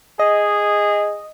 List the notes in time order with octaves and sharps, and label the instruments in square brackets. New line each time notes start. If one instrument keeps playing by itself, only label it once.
[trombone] G#4 [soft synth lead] D#5